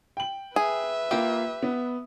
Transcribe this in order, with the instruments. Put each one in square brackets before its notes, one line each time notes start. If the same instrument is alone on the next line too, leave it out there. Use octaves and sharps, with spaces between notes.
[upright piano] G5 F#7
[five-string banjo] G#4 [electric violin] B4 E5
[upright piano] A#3 F4 [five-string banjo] G4
[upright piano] B3